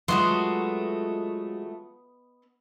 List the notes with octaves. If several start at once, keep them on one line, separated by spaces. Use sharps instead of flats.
F#3 G#3 A3 B3 F4 F#4 D#5 C6